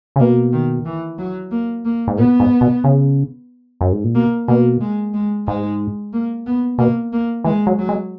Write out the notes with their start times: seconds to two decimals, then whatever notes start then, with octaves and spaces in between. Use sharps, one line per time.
0.16 C#3
0.20 B2 A#3
0.52 D#3
0.85 E3
1.18 F#3
1.51 A#3
1.85 A#3
2.08 G#2
2.18 A#2 B3
2.40 G#2
2.61 B2
2.84 C#3
3.81 F#2
3.93 G#2
4.04 A#2
4.15 B2 A#3
4.48 B2 A#3
4.81 G#3
5.14 G#3
5.47 G#2 G#3
6.13 A#3
6.46 B3
6.78 B2 A#3
7.13 A#3
7.44 E3 G#3
7.67 F#3
7.78 F#3
7.89 G#3